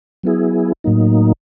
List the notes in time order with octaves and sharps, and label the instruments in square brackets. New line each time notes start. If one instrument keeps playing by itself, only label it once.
[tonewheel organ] F#3 B3 E4 G#4
A2 F#3 A#3 D#4